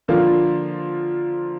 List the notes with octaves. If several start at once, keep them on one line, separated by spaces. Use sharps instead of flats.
D3 F3 A#3 F4